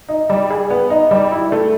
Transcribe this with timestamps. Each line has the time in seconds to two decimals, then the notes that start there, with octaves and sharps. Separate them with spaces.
0.09 D#4
0.30 G3
0.51 G#4
0.70 B3
0.90 D#4
1.11 G3
1.32 E4
1.52 A3